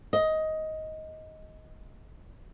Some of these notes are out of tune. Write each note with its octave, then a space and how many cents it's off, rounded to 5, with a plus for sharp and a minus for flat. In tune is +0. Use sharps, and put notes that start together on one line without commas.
D#5 +10